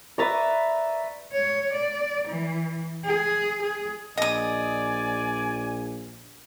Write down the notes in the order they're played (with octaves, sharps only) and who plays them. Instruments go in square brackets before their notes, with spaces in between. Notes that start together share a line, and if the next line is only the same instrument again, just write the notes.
[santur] B4 E5 C#6 [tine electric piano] D5 A#5 A6
[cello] C#5
D5
E3
G#4
G#4
[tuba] A#1 [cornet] D5 [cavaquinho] D#5 D#6 [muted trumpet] G#5